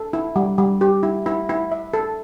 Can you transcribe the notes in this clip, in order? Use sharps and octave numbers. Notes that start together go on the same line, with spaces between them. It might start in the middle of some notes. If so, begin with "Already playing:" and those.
Already playing: A4
E4
G3
G3
G4
E4
E4
E4
E5
A4